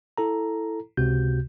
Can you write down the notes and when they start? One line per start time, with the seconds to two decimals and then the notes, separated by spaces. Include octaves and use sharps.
0.18 E4 A4 A#5
0.97 C#2 C3 F#4 G6